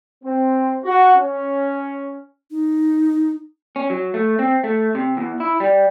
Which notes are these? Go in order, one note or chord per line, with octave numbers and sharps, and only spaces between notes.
C4
F#4
C#4
D#4
C#4
F#3
A3
C4
A3
C3
E2
E4
G3